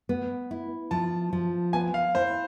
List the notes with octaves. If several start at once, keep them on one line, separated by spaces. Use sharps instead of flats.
B3
E4
F3 A5
F3
B3 G#5
F5
E4 C5